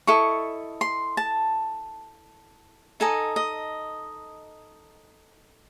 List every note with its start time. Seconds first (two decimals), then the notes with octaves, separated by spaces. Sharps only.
0.07 E4 A4 D#5 C#6
0.81 C6
1.17 A5
3.00 D#4 A4 D#5 G#5
3.36 D#5